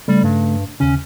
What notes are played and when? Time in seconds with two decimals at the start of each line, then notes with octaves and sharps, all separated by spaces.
0.08 C#3 G3 A3
0.23 G2
0.80 D#2 C#3 C#4